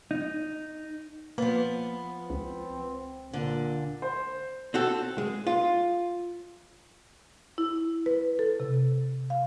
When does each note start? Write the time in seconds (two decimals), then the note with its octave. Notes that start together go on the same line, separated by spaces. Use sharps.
0.11 D#4
1.38 F3 A#3 B3
2.30 C#2 C4
3.33 A#2 D3
4.02 C5
4.74 C4 F#4 A4
5.18 G#3
5.47 F4
7.58 E4
8.06 B4
8.39 A4
8.60 C3
9.30 F5